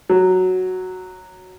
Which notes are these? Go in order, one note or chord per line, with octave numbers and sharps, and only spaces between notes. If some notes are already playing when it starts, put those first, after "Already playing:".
F#3